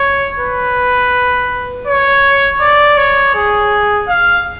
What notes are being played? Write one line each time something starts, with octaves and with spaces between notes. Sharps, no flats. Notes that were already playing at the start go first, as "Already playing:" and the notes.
Already playing: C#5
B4
C#5
D5
C#5
G#4
F5